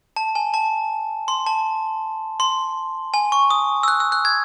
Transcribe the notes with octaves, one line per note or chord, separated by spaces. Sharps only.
A5
G#5
A5
C6
A5
C6
G#5
C#6
D#6
E6
F#6
E6
F#6
G#6